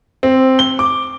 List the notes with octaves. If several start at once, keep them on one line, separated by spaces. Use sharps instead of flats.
C4
G7
D6